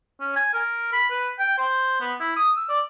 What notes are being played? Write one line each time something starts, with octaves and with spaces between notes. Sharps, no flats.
C#4
G#5
A#4
B5
B4
G5
C5
B3
E4
D#6
E6
D5